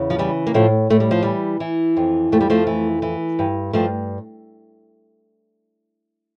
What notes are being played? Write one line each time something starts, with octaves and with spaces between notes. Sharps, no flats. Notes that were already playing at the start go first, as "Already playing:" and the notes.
Already playing: E2 C#3
F3
E3 G3
A#3
A2 F3 A3
A2 A3
G3
F3
E3 G3
E3
F2
F2 A3
G3
F3 A3
E3
E3
G2
G2 F3 A3